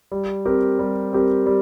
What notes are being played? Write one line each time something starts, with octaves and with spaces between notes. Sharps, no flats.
G3
C4 G4 A#4
G3
C4 G4 A#4
G3